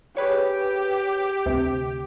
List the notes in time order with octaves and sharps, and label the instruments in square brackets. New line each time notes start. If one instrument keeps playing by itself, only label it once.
[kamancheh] G4 [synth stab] G#4 B4 C#5
[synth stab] D2 C3